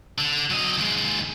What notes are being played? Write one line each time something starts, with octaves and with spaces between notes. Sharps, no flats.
D3
F#3 D#5
D#2 G#3